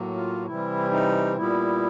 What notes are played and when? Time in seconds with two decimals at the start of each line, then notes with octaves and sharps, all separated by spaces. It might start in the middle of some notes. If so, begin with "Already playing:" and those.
Already playing: A2 F#3 A#3
0.16 F4
0.46 C3 E3 G3 E4
0.91 D#4
1.37 A#2 G3 B3 E4